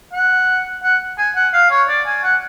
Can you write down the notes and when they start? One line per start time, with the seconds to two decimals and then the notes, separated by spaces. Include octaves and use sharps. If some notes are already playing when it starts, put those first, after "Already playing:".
0.13 F#5
0.83 F#5
1.18 G#5
1.36 F#5
1.53 F5
1.71 C#5
1.89 D5
2.06 G#5
2.23 F#5